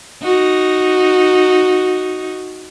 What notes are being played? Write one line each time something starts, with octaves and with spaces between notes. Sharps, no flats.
D#4 F#4